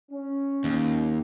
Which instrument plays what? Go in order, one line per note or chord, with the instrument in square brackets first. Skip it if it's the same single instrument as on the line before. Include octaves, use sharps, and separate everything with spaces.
[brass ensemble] C#4
[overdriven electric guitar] D#2